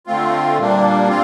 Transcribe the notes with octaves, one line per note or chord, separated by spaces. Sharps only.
D3 A3 C4 F4
A#2 G3 A#3 D4
C4 F4